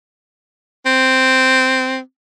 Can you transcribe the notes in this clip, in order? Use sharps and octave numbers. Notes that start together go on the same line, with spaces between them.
C4